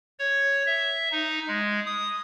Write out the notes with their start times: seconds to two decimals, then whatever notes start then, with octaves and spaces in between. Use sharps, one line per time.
0.19 C#5
0.67 E5
1.12 D#4
1.48 G#3
1.86 D#6